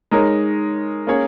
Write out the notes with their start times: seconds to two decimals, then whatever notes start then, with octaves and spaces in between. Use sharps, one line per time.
0.11 G#3 D#4 A#4 C#5
1.07 A#3 C#4 G#4 C#5